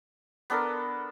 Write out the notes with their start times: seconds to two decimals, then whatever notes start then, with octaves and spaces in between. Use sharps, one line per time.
0.50 B3 D4 A4 A#4